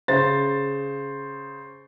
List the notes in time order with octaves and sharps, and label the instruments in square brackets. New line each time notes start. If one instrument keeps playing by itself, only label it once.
[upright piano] C#3 C5 A6